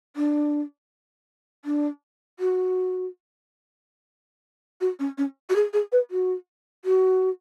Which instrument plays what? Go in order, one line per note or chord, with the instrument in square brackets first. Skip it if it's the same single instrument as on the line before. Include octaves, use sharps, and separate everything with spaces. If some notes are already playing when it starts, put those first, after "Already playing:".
[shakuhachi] D4
D4
F#4
F#4
C#4
C#4
F#4
G#4
G#4
B4
F#4
F#4